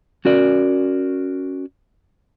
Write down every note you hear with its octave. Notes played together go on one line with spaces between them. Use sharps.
C#4 F#4 A#4 D5